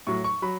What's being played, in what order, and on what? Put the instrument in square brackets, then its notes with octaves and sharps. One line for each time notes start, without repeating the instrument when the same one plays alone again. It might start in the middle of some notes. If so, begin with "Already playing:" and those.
[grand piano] A2 F#3 C#6
C#6
F#3 B5